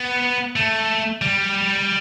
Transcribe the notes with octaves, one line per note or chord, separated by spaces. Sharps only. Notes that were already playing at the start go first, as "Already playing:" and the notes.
Already playing: B3
A3
G3